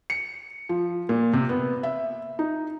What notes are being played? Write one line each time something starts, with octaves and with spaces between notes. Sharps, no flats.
C#7
F3
A#2
C3
B3
E5
D#4